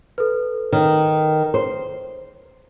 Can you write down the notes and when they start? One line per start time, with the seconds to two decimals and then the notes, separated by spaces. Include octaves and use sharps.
0.18 A4 B4
0.72 D#3
1.54 C5